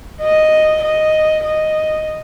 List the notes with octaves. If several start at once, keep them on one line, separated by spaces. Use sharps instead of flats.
D#5
D#5
D#5